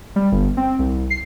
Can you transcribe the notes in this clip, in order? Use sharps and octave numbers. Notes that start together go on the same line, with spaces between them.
G3
G1
C4
C2
C7